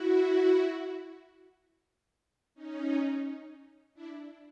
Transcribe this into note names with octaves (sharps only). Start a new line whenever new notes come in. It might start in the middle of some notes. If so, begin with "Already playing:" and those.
Already playing: E4 F#4
C#4 D#4
D4 E4